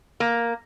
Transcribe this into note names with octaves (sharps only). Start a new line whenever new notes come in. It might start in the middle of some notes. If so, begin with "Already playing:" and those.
A#3